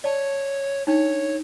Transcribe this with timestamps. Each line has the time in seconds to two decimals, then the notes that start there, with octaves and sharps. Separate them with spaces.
0.04 C#5 D5 A5
0.87 D4 D#4 C#5